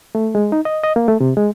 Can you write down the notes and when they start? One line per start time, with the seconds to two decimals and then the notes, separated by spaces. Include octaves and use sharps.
0.15 A3
0.35 G#3
0.52 D#4
0.65 D#5
0.84 D#5
0.96 A#3
1.08 A3
1.20 C3
1.37 G#3